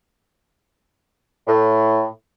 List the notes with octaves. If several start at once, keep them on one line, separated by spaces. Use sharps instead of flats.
A2